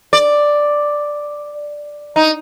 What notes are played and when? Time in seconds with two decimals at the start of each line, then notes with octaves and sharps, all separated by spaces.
0.13 D5
2.16 D#4